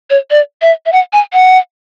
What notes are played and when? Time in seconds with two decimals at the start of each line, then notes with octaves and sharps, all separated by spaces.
0.10 C#5
0.31 D5
0.62 E5
0.86 E5
0.92 F#5
1.13 G#5
1.33 F#5